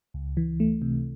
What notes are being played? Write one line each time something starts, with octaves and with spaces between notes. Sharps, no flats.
C#2
E3
A3
C3